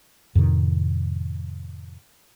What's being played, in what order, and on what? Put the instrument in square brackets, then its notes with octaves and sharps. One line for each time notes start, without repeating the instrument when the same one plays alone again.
[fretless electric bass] F2 A2 C3 D#3